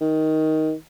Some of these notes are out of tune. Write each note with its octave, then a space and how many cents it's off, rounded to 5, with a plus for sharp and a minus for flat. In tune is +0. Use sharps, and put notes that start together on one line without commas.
D#3 +10